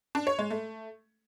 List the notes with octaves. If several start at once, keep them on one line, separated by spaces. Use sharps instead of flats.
D4
C#5
G#3
A3